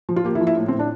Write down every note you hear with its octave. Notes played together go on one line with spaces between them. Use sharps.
F3
F4
A#3 G4
E4
F3
E4
A2
C4
A2
D4